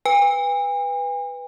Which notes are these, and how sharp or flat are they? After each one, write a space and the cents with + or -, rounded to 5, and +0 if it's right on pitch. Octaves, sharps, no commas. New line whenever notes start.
B4 +0 G#5 -45